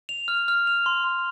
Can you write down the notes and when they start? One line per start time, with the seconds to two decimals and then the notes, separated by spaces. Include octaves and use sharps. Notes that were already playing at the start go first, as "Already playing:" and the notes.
0.09 F7
0.28 F6
0.48 F6
0.67 F7
0.86 C6
1.04 C6